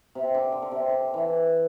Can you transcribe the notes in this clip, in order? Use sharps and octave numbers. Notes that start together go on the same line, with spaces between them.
C3
D3
D3
D3
C3
D3
E3